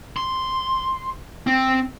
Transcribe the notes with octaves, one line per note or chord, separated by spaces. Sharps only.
C6
C4